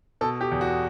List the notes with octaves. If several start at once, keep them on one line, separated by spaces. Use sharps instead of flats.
B2 A4
G4
E2
F#4